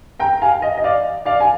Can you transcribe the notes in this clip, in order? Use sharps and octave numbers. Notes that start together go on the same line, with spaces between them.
G5 A#5
F5 G#5
D#5
D#5
D5 F5
D5 F5
G#5